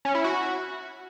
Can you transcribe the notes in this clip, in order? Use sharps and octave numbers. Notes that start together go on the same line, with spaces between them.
C#4
E4
F#4